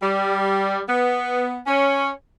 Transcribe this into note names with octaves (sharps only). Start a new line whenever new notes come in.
G3
B3
C#4